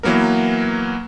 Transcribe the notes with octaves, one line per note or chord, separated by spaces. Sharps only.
E3 F#3 A#3 B3 A#4